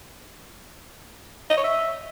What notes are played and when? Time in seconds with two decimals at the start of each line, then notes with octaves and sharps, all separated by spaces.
1.50 D#5
1.57 C#5
1.64 E5